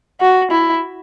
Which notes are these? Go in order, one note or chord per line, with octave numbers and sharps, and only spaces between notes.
F#4
E4